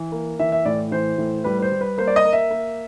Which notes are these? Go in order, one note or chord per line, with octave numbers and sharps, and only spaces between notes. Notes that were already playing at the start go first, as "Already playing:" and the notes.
Already playing: E3
A#3
E3 E5
E5
A2 D5
E3 C5
A2
G3 B4
B4
C5
G3
B4
A#3 C5
D5
D#5
A#3
E5
A#3